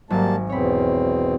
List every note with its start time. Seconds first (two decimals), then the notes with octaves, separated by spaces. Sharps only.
0.10 G#1 F#3 G3 A#3 A5
0.50 E2 B2 C4 C#5 B5